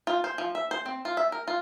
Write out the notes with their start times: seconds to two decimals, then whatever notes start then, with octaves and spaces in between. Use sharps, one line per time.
0.07 F4
0.24 C5
0.38 F3
0.55 E5
0.71 C5
0.86 C4
1.05 F4
1.17 E5
1.32 A#4
1.48 F4